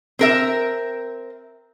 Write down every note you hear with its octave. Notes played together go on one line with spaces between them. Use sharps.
C4 A#4 E5